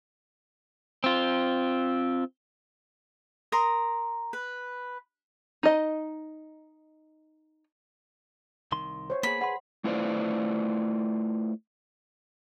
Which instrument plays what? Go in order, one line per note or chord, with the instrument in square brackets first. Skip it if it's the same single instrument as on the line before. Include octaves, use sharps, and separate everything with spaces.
[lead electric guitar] C4 F4
[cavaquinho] A#4 A#5 C6 D#6
B4
[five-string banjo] D#4 D#5
[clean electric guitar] C2 D#3 C6
[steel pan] C5 C#5
[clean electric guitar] A#3 B3 G#4 [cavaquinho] B5
[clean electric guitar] G#4 B4 [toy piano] F#5 C6
[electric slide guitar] A3 E4 F4 B4 C5 D5